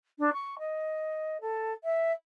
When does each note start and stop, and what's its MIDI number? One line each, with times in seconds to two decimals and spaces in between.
0.19 0.33 62
0.33 0.59 85
0.59 1.41 75
1.41 1.73 69
1.84 2.12 76